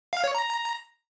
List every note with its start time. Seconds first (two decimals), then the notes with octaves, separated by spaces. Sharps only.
0.13 F5
0.24 C#5
0.35 A#5